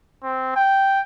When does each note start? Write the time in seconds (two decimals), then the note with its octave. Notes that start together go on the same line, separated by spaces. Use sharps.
0.23 C4
0.56 G5